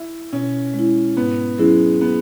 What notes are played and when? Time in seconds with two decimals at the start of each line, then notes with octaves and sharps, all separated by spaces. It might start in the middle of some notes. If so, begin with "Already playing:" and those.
Already playing: E4
0.33 B2 C#4
0.74 G#3 E4
1.17 G#2 B3
1.58 F#3 G#3 C#4 E4
2.01 B3